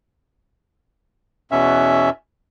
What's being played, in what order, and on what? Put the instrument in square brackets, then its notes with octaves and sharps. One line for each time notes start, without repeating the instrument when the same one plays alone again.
[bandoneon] E2 B2 C#4 E5